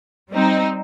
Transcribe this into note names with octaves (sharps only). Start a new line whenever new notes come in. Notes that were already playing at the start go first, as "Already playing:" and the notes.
G3 C4 D#4